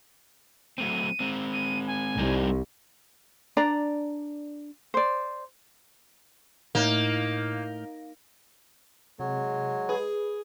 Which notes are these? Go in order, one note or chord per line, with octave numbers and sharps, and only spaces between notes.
F#3 A3 C4 D#7
G#3 C4
D#7
G#5
C2 G3 D#4 C5
D4 D5 A#5
C5 D5
A2 A#3 D#4 F6 G6
C3 F#3 G#3
G#4 B4